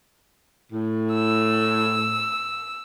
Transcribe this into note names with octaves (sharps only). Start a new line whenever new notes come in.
A2
E6